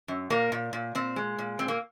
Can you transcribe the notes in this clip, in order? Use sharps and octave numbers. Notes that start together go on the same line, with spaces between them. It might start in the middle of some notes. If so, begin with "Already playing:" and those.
F#2
A#2 A#3
A#2
A#2
A#2 C4
G#3
A#2
A#2 C4
A#3